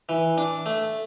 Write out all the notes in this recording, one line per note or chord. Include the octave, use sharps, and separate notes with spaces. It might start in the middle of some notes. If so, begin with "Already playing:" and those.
E3
D4
A3